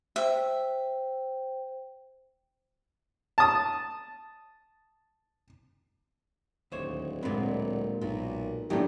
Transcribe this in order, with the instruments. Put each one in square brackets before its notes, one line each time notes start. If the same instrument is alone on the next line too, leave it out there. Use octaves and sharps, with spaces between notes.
[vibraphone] C5 G5 [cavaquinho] E5
[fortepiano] A5 D#6
[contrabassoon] D1 [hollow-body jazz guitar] D#2 C5 C#5
[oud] A#2 B3 [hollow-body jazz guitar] G#3 C4
[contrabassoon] B1 [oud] A#2
[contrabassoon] A2 [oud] D#3 E3 A3 [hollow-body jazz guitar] F#3 [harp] B3 D4 G4